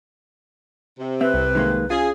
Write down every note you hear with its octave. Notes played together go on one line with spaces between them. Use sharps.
C3
C4 B4 E5
C2
D#3 G#3 A#3
C#4 F4 G#4